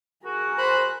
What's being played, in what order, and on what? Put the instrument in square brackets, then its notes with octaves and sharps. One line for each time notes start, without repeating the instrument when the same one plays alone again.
[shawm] F#4 [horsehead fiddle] G#4 A#4
[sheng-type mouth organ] C5 B5 F#6